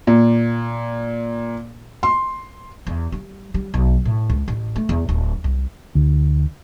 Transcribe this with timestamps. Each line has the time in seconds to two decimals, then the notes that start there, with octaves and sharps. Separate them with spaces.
0.07 A#2
2.03 C6
2.87 E2
3.12 G3
3.54 G3
3.74 B1
4.05 A2
4.30 C#2
4.48 A1
4.76 A3
4.89 E2
5.09 D1
5.44 C2
5.95 D2